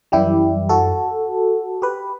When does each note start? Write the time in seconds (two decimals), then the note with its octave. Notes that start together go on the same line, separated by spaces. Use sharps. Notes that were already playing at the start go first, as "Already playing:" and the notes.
0.12 F#2 E3 G3 E4 G4
0.69 F#4 A4
1.82 G4 B4